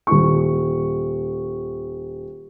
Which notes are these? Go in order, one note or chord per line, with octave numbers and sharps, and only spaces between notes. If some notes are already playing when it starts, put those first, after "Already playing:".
D#1 C#6